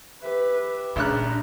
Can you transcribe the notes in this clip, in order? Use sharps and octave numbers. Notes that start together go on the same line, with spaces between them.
G4 B4 E5
G#1 A#2 C#3 D4 A#5 F#6